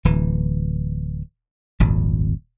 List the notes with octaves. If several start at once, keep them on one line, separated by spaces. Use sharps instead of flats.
D1 E3
D#1 G#1 F2